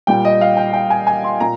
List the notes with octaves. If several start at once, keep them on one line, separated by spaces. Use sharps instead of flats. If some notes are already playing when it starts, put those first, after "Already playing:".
A#2 G3 G5
D#5
F5
G5
G5
G#5
G#5
C6
A#2 A#5